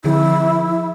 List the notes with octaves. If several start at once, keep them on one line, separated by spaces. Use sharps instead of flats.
D3 F3 E4 G#4